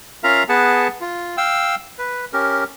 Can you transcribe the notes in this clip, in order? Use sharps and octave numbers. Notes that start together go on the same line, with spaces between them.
C#4 F4 A#4 E5 F5 A#5
B3 G#4 B4 F#5 A5
F4
F5 G5 E6
B4
C#4 G4 A#4